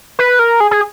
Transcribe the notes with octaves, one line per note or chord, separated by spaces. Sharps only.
B4
A#4
G#4
G#4